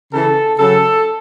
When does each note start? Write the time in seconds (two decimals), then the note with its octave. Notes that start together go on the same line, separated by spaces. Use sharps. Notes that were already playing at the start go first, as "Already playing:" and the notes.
0.12 C#3 E3 A4
0.58 C#3 F#3 A4